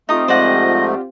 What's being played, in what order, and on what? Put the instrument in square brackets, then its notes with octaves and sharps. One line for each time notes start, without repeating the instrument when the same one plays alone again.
[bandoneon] A3 [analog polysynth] C4 F4 G4 [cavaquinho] D#4 D#6
[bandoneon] G#2 F3 A3 [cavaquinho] C5 D5 F#5 [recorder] D#5